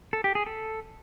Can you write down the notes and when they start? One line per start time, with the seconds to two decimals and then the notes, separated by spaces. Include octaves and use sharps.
0.13 A4
0.24 G4
0.35 G#4
0.46 A4